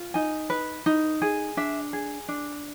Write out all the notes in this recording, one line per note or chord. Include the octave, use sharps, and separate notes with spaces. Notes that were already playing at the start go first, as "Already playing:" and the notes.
Already playing: F4
D#4 G#5
B4
D#4
G#4
D4 E5
G#4
D4